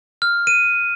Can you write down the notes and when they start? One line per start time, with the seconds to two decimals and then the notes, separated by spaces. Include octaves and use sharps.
0.22 F6
0.47 D#7